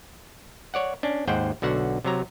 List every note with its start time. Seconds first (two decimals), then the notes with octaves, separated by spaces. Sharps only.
0.74 C#5 D5 F#5
1.03 C#4 D4
1.28 D#2 G#2 C5 F#5 G5
1.62 B1 D3 F#4 F#5
2.05 C3 F#3 A#5